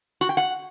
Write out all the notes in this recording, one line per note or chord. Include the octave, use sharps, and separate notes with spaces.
F#4
G5
F#5